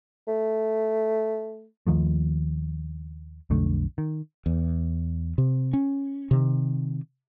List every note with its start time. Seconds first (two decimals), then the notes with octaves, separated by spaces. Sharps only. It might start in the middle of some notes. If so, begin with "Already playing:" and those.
0.28 A3
1.87 D#2 D#3 F3 A3
3.50 B1 F2 D3 A3
3.98 D#3
4.46 E2
5.38 C3
5.73 C#4
6.31 C3 D#3